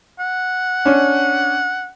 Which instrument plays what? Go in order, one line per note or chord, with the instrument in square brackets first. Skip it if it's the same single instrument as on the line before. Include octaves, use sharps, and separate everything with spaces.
[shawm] F#5
[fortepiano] C#4 D4